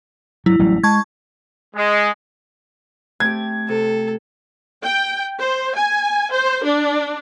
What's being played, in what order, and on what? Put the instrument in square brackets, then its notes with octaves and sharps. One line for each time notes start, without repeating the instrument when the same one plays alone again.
[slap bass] G2 F#3 [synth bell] E4
[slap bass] A1 F#3 G3
[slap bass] G#3 [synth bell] A5 C#6 G#6
[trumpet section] G#3
[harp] A3 C4 G4 [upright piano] G#6
[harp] C3 [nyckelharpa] A4
[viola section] G5
C5
G#5
C5
D4